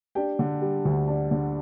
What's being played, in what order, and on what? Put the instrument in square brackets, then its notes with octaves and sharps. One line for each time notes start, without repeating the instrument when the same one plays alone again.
[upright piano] D4 G4 G5
D3
G3
D2
D4
D3